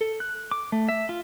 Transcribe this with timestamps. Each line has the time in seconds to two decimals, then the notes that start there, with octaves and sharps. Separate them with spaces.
0.01 A4
0.20 F#6
0.51 D6
0.72 A3
0.89 E5
1.09 F4